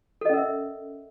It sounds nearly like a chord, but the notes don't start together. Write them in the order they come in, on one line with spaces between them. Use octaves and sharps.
A4 D#5 C#4 A#4 E5